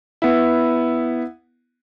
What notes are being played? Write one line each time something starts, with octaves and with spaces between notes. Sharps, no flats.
B3 E4